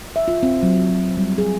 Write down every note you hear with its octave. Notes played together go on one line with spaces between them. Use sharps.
E5
F4
C4
F#3
F#3
G3
G#4